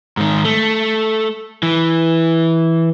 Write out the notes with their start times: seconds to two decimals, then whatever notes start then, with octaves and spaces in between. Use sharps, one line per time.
0.17 G#2 D#3
0.45 A3
1.63 E3